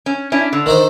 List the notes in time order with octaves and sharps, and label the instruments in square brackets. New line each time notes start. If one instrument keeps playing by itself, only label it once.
[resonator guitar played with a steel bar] C#4
C#4 D4 E4
D3
[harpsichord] D#3 D#4 C5